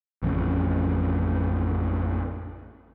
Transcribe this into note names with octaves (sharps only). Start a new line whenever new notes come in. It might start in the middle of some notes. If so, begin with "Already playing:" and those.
A1 F2 C#3